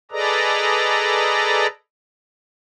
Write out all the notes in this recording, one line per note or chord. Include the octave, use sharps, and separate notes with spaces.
G#4 A4 B4 D5 D#5 A#5